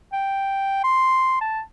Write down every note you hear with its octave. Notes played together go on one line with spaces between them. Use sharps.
G5
C6
A5